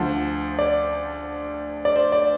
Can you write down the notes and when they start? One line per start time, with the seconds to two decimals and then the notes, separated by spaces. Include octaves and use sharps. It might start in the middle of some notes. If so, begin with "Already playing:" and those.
Already playing: D2 D3 F3 C5
0.59 D5
1.85 D5
1.96 C5
2.12 D5